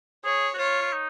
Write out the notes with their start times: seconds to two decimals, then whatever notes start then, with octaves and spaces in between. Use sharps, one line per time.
0.25 G#4 C#5
0.54 F#4
0.58 F4 C#5
0.82 F4
0.93 D#4